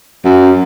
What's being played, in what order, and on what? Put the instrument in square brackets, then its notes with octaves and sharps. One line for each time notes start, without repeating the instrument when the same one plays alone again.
[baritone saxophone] F#2